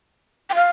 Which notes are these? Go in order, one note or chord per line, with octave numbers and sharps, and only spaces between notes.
G5
F5